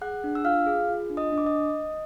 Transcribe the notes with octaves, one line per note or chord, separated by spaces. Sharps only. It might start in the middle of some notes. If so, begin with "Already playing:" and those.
G#4 F#5 F#6
D4
E6
F4 F5 F6
G#4
F4
D4
D#5 D#6
D4
D6
D#5 D#6